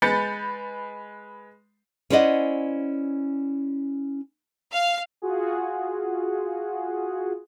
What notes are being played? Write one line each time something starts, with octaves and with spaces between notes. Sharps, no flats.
G#3 B4 B5 G6 A6 C#7
C#4 E4 C5 D5 D#5 F#5
F5
F4 F#4 G#4